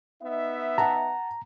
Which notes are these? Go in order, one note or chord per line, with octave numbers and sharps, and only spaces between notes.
B3 D#4 E5
F#5 A5 A#5